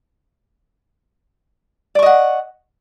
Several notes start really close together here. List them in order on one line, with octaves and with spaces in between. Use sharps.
D5 C#6 D#5 F#5